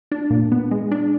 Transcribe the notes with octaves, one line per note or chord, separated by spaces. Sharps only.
D4
A#2
B3
G#3
D4